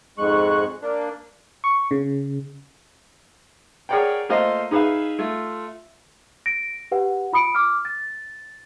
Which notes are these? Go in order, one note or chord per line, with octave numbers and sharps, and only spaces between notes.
F2 G#2 G#3 C#6 F#6
A#3 D4
C#6
C#3
G#4 A#4 C#5 D5 F#5 G5
A3 A#3 F4 C5 D#5 F5
D#4 G#4 B4 E5 F5
A3 F4
A#6 D7
G4 B4 F#5
F4 B5 D#6 C#7 D7
D6 F6
A6